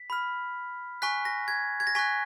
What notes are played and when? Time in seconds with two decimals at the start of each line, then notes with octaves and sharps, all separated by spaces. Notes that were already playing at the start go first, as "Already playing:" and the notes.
Already playing: B6
0.10 B5 F6
1.02 G#5 C#6 F#6 B6
1.25 A#6
1.48 G#6
1.80 G#6
1.87 A#6
1.95 G#5 C#6 F#6 B6